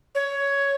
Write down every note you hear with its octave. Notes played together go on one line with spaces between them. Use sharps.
C#5